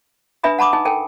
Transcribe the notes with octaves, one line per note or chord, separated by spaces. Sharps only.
D4 B4 E5 G#5 B5 D#6
F#5 A5 B5 D6 D#6
D#4 G#5
A4 A#4 G5 G#5